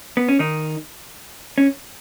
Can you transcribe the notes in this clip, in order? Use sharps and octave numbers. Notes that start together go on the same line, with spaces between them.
B3
C#4
D#3 D#4
C#4